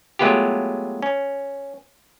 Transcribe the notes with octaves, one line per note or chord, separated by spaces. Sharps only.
F#3 G#3 A3 B3 F4 G4
C#4